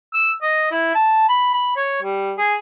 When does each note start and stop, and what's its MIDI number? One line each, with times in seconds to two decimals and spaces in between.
0.14 0.32 88
0.42 0.70 75
0.72 0.92 64
0.95 1.25 81
1.29 1.51 83
1.54 1.75 83
1.76 2.00 73
2.02 2.33 55
2.38 2.55 68